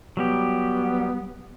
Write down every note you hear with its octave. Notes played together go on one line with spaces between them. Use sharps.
F#3 G3 B3 G4